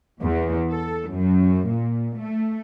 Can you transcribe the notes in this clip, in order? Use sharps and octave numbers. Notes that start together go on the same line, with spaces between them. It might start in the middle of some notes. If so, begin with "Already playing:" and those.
E2
A4
F#2
A#2
A3